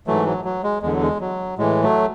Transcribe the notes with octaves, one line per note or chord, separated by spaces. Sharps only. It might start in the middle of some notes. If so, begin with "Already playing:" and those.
G#2 E3 F#3 A3
F#3
F#3
G#3
E2 D3 G#3
F#3
G#3
F#3
A2 E3 G#3
F#3 A3